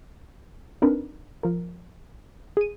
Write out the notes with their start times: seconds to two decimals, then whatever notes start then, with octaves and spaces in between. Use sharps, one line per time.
0.82 C4 D4 D#4 A#4 B4
1.43 F3 A#4
2.57 G#4 D#7